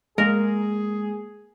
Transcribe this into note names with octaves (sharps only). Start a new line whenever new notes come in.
G#3 A#3 G#4 A#4